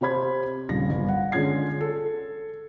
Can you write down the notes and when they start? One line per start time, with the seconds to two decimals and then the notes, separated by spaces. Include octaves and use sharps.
0.01 C3 G4 C5 B5 G#6
0.69 D#1 A#1 C#3 A#6
0.89 G1
1.08 F#5
1.32 D3 G#3 C#4 F4 G#6 C7
1.81 A4